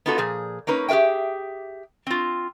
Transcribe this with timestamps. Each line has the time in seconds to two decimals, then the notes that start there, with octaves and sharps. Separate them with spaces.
0.06 B3 D#4 F4 F#4 A4
0.18 A#2 F3 G#4
0.67 A#3 C#4 D#4 B4
0.89 G4 G#4 B4 E5 G5
2.07 C4 F4